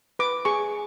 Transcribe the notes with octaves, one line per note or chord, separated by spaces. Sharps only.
B4 D6
G#4 C#6